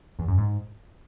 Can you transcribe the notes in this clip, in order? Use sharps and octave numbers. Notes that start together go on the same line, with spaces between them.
E2
F#2
G#2